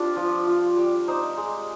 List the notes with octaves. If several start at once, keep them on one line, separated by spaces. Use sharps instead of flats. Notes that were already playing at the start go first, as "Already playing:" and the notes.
Already playing: C4 D4 F4 G4
F3
F4
G3
D#4 C5
G#3